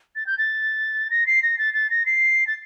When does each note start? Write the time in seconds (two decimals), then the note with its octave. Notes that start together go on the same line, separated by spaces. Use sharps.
0.16 A6
0.27 G6
0.38 A6
1.11 A#6
1.27 C7
1.43 A#6
1.58 A6
1.74 A6
1.90 A#6
2.06 C7
2.47 A6